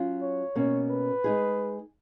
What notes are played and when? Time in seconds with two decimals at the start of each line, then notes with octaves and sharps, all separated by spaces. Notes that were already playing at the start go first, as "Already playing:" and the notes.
Already playing: F#3 C#4 F4
0.22 C#5
0.55 B2 A#3 C#4
0.90 B4
1.24 G#3 D#4 G#4